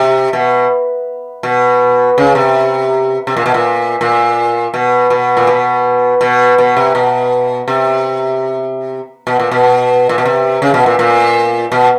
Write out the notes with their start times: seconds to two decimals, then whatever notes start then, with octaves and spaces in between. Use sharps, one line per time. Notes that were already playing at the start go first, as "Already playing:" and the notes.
Already playing: C3
0.33 B2
1.43 B2
2.18 C#3
2.35 C3
3.27 C3
3.37 A#2
3.46 B2
3.54 A#2
4.01 A#2
4.74 B2
5.10 B2
5.37 A#2
5.47 B2
6.21 B2
6.58 B2
6.77 C3
6.95 B2
7.68 C3
9.27 B2
9.40 A#2
9.51 B2
10.09 A#2
10.18 B2
10.25 C3
10.62 C#3
10.74 B2
10.86 A#2
10.99 A#2
11.72 B2